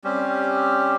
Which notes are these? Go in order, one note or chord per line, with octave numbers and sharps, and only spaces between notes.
G3 C4 C#4 G4